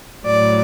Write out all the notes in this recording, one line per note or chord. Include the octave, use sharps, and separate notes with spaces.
A2 F#3 D5